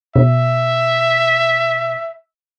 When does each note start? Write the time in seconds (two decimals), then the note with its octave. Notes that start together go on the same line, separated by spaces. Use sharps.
0.16 B2 E5